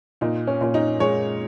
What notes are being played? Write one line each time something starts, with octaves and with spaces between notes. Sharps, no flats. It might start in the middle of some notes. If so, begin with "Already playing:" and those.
A#2 D#4
C#4
A#2 C#4
D#4
G#3 C#5